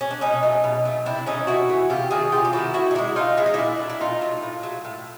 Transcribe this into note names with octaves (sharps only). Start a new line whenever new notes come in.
C#4
D4
B2 C#4 D#4
F#3 A3
B2
F#3 A3
C3 D4 E4
E3 A3 C#4 D#4
C3 E4 F#4
E3 A3
C3 F4 G4
D#3 F#3 A3 F#4 G#4
C3 F4 G4
G4
D#3 F#3 A3 E4 F#4
D3 E4 F#4
D#4
F3 G#3 D4 E4
D3 D#4 F4
F3 G#3 E4
D#4
A#2 D4 E4
F#3 A3
E4
A#2 D#4 F4
F#3 A3
A2
F#3 A3
A2